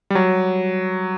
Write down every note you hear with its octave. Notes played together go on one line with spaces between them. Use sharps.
G3
F#3